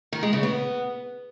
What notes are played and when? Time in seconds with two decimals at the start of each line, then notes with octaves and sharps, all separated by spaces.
0.12 D#3
0.23 G#3
0.33 C#3
0.43 B3